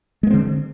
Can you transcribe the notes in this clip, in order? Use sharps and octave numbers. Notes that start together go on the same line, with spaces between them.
D3 G#3 A#3 C4